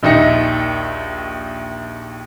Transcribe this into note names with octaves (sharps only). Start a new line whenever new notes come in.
A#1 D#2 D#4 E5 A#6 C#7